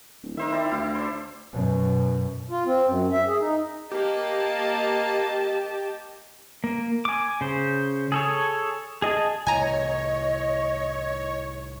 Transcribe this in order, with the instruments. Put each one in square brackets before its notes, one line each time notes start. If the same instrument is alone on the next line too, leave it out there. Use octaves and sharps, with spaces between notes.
[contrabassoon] D1
[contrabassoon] D#3 [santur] A#4 C5 E5
[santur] C4 E4 D5
[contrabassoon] D2 [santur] E4 F5
[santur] D4 C5
[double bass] F#2 B2
[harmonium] F4
C4
F#2
E5
G#4
D#4
[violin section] A#3 [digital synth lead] G4 [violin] D#5 A5
[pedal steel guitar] A#3
G#5 D6
C#3 C5
G#4 A4 C#5
G#4 D#5 G#5 A5
[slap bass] C2 A2 E3 [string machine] C#5 [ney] D#5 [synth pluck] G#5 A#5